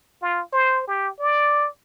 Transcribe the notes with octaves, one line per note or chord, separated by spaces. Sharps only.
F4
C5
G4
D5